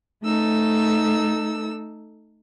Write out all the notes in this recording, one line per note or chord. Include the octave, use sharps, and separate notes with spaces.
A3 D#4 A4 E6